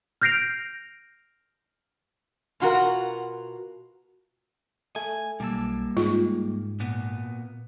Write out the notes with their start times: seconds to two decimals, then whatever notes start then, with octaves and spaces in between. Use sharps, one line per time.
0.22 F6 G6 A#6 C7 D7 F7
2.60 B2 F4 F#4 A#4
4.96 A3 G#5
5.40 B1 G3 A#3 A5 E6
5.97 G#2 F4
6.80 A#2 B3